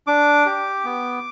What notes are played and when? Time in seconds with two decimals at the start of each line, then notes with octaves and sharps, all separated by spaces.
0.07 D4 D6
0.46 G4
0.85 B3